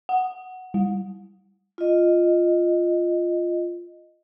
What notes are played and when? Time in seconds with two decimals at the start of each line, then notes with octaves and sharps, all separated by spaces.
0.09 F#5
0.74 G3
1.78 F4 D#5